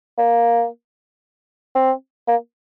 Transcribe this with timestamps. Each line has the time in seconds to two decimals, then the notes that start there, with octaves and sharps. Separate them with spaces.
0.18 A#3
1.75 C4
2.28 A#3